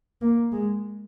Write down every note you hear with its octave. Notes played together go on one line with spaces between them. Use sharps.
A#3
G#3